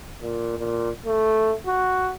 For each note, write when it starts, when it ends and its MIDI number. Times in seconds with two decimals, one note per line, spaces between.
0.21 0.57 46
0.58 0.90 46
1.06 1.54 57
1.66 2.14 66